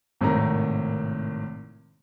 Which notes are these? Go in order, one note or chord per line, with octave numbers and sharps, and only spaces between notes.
G#1 A2 C3 D#3 A#5